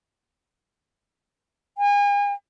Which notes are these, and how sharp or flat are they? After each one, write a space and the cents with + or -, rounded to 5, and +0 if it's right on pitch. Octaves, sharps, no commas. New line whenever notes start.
G#5 -35